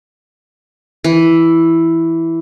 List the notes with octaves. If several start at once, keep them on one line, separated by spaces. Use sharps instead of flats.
E3